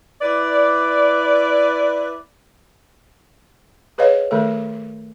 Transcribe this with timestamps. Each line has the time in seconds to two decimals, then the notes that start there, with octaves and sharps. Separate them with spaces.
0.21 E4 B4 D5
3.98 G#4 B4 C#5 D#5 F5
4.31 D#3 A3 A4